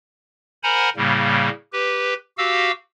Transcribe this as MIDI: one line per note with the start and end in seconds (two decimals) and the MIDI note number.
0.63 0.89 70
0.63 0.89 72
0.63 0.89 78
0.63 0.89 80
0.63 0.89 82
0.63 0.89 83
0.97 1.49 45
0.97 1.49 49
0.97 1.49 55
0.97 1.49 58
1.73 2.14 67
1.73 2.14 71
2.38 2.71 66
2.38 2.71 67
2.38 2.71 77
2.38 2.71 88